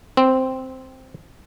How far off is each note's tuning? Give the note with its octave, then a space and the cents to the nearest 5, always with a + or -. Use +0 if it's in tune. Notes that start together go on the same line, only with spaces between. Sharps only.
C4 -5